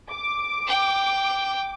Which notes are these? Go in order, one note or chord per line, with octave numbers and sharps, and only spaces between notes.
D6
G5